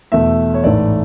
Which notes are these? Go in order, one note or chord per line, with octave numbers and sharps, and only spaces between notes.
E2 B2 A3 E5
C#5
A1 G#2 E3 A3 D5